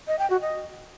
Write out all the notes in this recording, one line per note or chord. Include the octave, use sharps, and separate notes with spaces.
D#5
G5
F#4
D#5